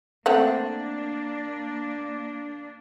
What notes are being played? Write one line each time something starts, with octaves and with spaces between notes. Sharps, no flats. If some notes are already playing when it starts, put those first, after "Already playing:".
A3 A#3 C4 D4 F#5